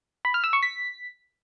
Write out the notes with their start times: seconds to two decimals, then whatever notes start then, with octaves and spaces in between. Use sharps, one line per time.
0.25 B5
0.34 F6
0.44 E6
0.53 C#6
0.63 B6